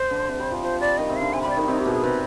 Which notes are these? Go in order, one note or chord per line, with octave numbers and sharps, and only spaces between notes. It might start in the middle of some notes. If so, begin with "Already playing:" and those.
Already playing: C5
D3
C3
G3
F3
F3 C5
G3 D5
D#3 D#5
C3
D3 F5
C3 G#5
B5
G3
D5
D#3 D#4
C3 D#4
G4
B2
G#4
C3 B4